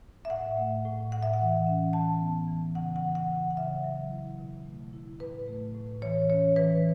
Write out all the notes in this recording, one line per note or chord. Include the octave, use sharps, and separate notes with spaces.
E5
A2 F#5
A3
A2
A2 F#5
E5
F#5
E3
C#4
E3 A5
B3
E3
C#3 F#5
F#5
E3
F#5
C#3
F#5
C#3 E5
F#3
E4
B2
A3
E4
A2 B4
A3
A2
E3 C#5
C#4 C#5
E3 B4